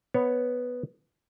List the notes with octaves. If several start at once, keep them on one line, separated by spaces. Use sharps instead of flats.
B3 C#5